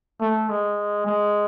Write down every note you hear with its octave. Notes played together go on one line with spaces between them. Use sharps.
A3
G#3
G#3